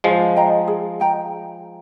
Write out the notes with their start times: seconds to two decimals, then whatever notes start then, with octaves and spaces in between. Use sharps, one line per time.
0.04 F3 G#3 G#4
0.36 D#5 G5 A#5
0.68 G#4
1.00 D#5 G5 A#5